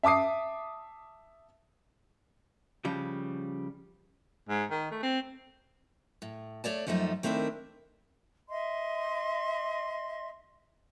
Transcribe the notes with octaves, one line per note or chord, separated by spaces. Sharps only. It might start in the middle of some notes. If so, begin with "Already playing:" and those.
E5 A5 D6 D#6 C7
C#3 F3 G3
G#2
D#3
A3
C4
A2
A3 C#5 D5 A5
F#2 F3 G3 A3 D#4
D#3 A3 C4 D4 E4 A#4
D#5 E5 C6